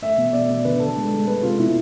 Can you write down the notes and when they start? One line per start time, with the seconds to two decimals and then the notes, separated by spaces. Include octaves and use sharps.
0.02 A3 E5
0.17 B2
0.33 B2 D5
0.49 B2
0.65 D3 B4
0.80 D3 A4
0.97 G#3
1.12 G#3
1.27 G#3 B4
1.43 C3 F4
1.59 B2 E4